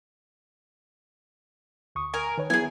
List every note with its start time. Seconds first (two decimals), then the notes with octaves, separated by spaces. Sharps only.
1.95 D2 C#6 D#6
2.14 A#4 G#5
2.38 D#3 B4 C#5
2.50 F#3 B3 E4 G#4 G#5